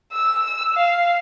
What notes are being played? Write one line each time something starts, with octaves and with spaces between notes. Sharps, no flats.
E6
F5